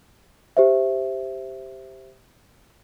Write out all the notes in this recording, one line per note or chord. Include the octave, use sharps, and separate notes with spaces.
G4 C5 E5